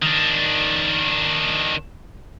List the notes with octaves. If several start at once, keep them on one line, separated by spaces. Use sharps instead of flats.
D#3 D4